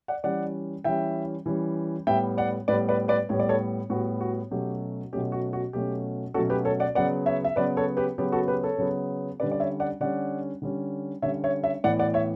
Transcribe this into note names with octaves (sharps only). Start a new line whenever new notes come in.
D5 F#5
E3 G3 C#4 D5 F#5
E3 G3 C#4 E5 G5
E3 G3 C#4
A2 G3 B3 E5 G5
D5 F#5
A2 G3 B3 B4 D5
B4 D5
B4 D5
A2 G3 B3 C#5
D5
A4 C#5
A2 G3 B3 F#4
F#4
B2 F#3 A3 C#4 G4
B2 F#3 A3 C#4 G4
F#4
F#4
B2 F#3 A3 C#4 G4
B2 F#3 A3 C#4 F#4 A4
G4 B4
A4 C#5
D5 F#5
C#3 F#3 B3 D5 F#5
C#5 E5
E5
C#3 F#3 B3 B4 D5
A4 C#5
G4 B4
C#3 F#3 B3 G4
F#4 A4
G4 B4
A4 C#5
C#3 F#3 B3
D3 G3 C#4 B4 D5
D5
C#5 E5
D5 F#5
D3 G3 C#4 D5 F#5
D3 G3 C#4
D3 G3 C#4 C#5 E5
C#5 E5
C#5 E5
A2 E3 B3 D5 F#5
D5 F#5
C#5 E5